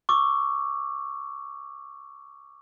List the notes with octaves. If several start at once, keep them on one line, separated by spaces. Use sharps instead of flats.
C#6 D6 E6